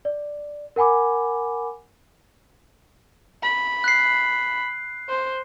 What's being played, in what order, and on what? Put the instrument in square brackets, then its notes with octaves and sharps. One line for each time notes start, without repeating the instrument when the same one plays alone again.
[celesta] D5
A#4 F#5 G#5 B5 D6
[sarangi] B5
[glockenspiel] F#6 C7
[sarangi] C5